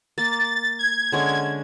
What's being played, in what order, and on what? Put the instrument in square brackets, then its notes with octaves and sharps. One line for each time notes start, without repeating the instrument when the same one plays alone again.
[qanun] A#3 [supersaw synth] A6
[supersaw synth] G#6
[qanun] D3 G#3 C#4